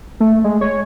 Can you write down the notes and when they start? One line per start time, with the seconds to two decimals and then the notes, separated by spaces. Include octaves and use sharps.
0.20 A3
0.44 G#3
0.61 C#5